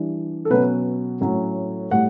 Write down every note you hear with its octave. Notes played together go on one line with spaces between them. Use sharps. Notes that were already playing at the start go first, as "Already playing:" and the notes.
Already playing: E3 G3 D4
A4
B2 F#3 C#4 B4
A2 F#3 C#4
A2 G3 F#5